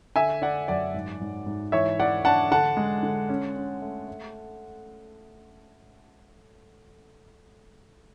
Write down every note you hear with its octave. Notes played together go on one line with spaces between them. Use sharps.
D3 E5 G#5
D3 D5 F#5
F#2 D5 F#5
G#2
G#2
G#2
E3 C#5 E5
E3 D5 F#5
D4 F#5 A5
D3 F#5 A5
G#3
D3
C#4
C#4
A3
A3